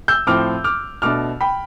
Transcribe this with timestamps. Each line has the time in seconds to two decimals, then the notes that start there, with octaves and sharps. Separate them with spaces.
0.08 E6 G6
0.27 A2 F3 C4 D6 F6
0.64 D6 F6
1.02 B2 A3 D4 D6 F6
1.41 G5 B5